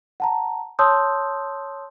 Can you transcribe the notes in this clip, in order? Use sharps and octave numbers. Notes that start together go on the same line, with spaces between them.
F#5 A5 A#5
C#5 A5 C6 D#6 E6 G6